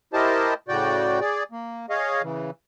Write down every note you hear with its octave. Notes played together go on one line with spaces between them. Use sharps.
E4 G4 A#4 C5 D#5 A5
A2 C#3 F#4 D5 G5
G#4 D5
A#3
G#4 C#5 D#5 F5
C#3 E3